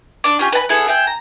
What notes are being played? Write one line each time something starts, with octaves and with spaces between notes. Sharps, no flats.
D4 D5 D6
C#4 F4 G4 G#5
B4 G#5 A5 B5
B3 E4 G#4 A4
G#4 E5 G5
A#5